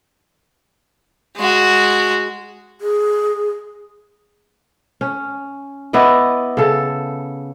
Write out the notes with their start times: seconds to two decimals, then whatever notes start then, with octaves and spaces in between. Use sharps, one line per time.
1.37 G#3 F#4
2.81 G#4
5.01 C#4
5.93 B3 E4 D5 D#5
6.57 C#3 A4